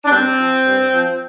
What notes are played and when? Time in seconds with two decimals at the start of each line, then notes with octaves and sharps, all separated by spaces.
0.05 D4
0.10 G2 C4
0.38 F3
0.66 G2
0.94 F3